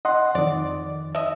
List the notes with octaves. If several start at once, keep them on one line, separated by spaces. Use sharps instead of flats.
D#5 F#5 C6
F2 D#3 D5
D#5 E5